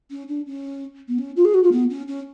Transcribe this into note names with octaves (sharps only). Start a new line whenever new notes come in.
C#4
D4
C#4
B3
C#4
F4
G#4
F#4
F4
B3
C#4
C#4